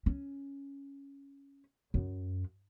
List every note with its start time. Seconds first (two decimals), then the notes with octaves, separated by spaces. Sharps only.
0.06 C#4
1.94 F#2